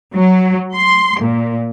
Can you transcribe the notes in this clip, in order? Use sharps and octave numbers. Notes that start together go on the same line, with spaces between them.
F#3
C6
A#2